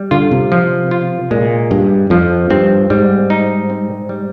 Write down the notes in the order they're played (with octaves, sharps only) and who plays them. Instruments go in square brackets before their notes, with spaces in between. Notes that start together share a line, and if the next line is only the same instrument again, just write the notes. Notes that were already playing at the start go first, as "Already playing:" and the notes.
Already playing: [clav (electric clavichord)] G3
[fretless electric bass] D3 [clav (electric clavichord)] F4
[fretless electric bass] C3
[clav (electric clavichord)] F3
F4
[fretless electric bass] A#2 [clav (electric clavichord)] G#3
[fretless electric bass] G2 [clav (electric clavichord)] G4
[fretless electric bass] F2 [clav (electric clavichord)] F3
[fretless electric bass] G2 [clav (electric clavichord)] C4
[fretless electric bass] G#2 [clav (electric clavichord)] G3
[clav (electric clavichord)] D#4
C4
G3